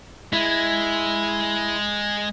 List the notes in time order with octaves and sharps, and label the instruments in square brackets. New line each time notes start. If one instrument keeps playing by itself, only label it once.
[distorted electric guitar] G#3 [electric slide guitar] E4